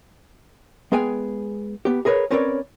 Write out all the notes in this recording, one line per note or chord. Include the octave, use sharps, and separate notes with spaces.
G#3 B3 G#4 F5 G5 G#5
B3 G4
G#4 A#4 B4 C#5
C4 C#4 A#4 B4 C#5 D5